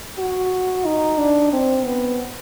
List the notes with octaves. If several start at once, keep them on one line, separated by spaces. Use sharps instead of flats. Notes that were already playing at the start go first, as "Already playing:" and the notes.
F#4
D#4
D4
C4
B3